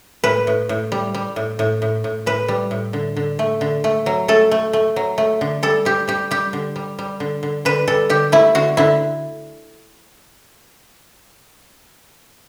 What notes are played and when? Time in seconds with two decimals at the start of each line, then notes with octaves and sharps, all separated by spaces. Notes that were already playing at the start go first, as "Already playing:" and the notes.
0.24 A2 B4
0.47 A2
0.69 A2
0.92 G3
1.14 G3
1.36 A2
1.59 A2
1.82 A2
2.04 A2
2.26 A2 B4
2.48 G3
2.71 A2
2.93 D3
3.17 D3
3.39 A3
3.61 D3
3.84 A3
4.06 F#3
4.28 A3 A4
4.51 A3
4.73 A3
4.96 F#3
5.18 A3
5.41 D3
5.63 G3 A4
5.85 G3 G4
6.08 G3 G4
6.31 G3 G4
6.53 D3
6.76 G3
6.99 G3
7.20 D3
7.43 D3
7.65 D3 B4
7.88 G3 A4
8.09 D3 G4
8.32 A3 E4
8.55 D3 F#4
8.77 D3 E4